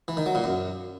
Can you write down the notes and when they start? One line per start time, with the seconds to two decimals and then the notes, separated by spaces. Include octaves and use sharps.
0.08 E3
0.17 D#3
0.26 F#3
0.35 A#2
0.44 F#2